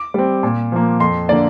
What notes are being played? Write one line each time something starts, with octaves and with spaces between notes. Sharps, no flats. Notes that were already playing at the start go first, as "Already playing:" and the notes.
Already playing: D6
G3 C4
A#2
F3 A#3
F2 C6
D3 A#3 D5